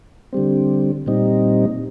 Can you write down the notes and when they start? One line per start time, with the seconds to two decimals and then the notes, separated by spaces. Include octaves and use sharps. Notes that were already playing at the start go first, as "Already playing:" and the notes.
0.33 D3 G3 C4
1.06 A#2 G3 C4 D#4